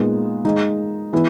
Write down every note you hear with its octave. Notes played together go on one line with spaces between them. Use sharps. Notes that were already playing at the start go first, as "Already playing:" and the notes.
Already playing: A#2 G#3 B3 D#4 G#4
G#3 D#4 G#4
E3 B3 E4